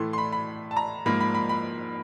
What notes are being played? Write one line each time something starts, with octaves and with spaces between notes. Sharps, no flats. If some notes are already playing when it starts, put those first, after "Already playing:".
Already playing: A2 E3 A3 C6
C6
B5
B5
A5
A#5
G#2 F3 A#3 B5
B5
B5
B5